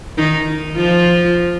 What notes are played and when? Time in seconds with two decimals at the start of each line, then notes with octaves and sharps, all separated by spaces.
0.18 D#3 D#4
0.76 F3 F4